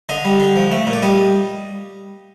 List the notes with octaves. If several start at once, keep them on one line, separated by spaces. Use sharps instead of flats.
D3 D#5
G3
D3
F3
A3
A#2
D5
G3 D#5